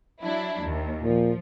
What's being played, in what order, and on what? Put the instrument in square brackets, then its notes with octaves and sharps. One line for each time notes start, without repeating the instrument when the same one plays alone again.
[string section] F#3 D4 E4
D#2
[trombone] A#2 [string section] F3